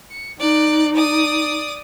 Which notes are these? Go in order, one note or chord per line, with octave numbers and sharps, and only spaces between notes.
C#7
D#4 D5 F#6
D5 D#6